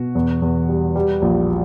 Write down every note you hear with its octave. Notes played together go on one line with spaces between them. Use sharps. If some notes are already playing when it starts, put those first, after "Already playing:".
Already playing: B2 F#4
E2
E2
G3
G3
A#1